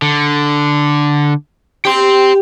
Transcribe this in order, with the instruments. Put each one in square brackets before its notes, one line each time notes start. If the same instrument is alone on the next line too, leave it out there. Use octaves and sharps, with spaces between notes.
[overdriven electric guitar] D3
[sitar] G4 [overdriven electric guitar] G5 C6